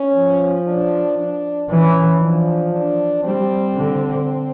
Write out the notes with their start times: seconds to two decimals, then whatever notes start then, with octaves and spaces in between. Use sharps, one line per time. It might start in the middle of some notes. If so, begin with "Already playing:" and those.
Already playing: C#4
0.15 F3
0.67 D4
1.18 D4
1.70 E3 C#4
2.21 F3 D4
2.72 D4
3.24 G3 C4
3.75 D3